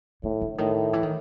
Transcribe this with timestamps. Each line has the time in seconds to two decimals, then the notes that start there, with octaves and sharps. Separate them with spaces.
0.23 A2 D#3
0.41 D3
0.58 A2 D#3
0.93 E3
1.03 D#3